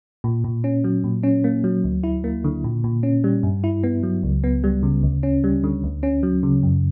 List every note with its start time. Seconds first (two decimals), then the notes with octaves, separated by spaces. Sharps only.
0.24 A#2
0.44 A#2
0.64 C#4
0.84 F#3
1.04 A#2
1.23 C#4
1.44 A#3
1.64 F#3
1.84 D2
2.03 E4
2.24 A#3
2.44 D3
2.64 A#2
2.84 A#2
3.03 C#4
3.24 G3
3.43 G2
3.64 E4
3.83 B3
4.03 F#3
4.23 C#2
4.44 B3
4.64 G3
4.83 C#3
5.03 D2
5.23 C#4
5.44 G3
5.64 D3
5.84 D2
6.03 C#4
6.23 F#3
6.43 C#3
6.63 F#2